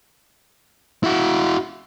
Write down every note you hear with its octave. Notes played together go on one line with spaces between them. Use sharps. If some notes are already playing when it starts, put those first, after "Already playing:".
E4 F#4